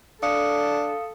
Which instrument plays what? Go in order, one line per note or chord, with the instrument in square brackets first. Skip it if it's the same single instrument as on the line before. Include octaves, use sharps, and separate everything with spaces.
[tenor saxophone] D4 [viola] A4 [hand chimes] F5 D#6 C#7